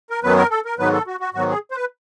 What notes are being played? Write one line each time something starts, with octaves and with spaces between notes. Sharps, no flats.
A#4
F#2 D#3 F#3 B3 B4
A#4
A4
A#4
G#2 D#3 F#3 B3 B4
A4
F#4
F#4
G#2 D#3 F#3 B3 F#4
G#4
C5
B4